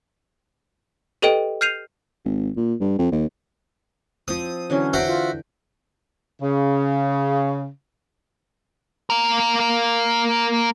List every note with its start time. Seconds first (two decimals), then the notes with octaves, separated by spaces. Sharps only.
1.22 G4 A4 B4 D#5 G5 D7
1.61 F6 G6 C7 D#7 F7
2.25 G#1
2.56 A#2
2.80 G2
2.99 F2
3.12 D#2
4.28 F3 C4 D#6
4.70 D3 E3 F#3 C#4
4.93 F#4 C5 E5 G5
5.07 F4
6.41 C#3
9.10 A#3 A#4